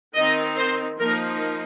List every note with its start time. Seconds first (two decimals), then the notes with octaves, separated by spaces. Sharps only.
0.15 D#3 C4 D#4 D#5
0.57 C5
0.99 F3 A#3 D#4 A#4